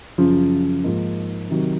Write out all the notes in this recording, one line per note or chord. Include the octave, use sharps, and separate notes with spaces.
F#2 C#3 F3
G#2 F3 A#3 D#4
C3 D#3 F#3